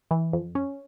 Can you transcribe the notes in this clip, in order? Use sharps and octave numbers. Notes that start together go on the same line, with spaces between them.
E3
F2
C#4